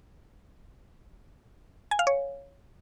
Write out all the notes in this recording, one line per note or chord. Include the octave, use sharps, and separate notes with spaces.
G#5
F5
C#5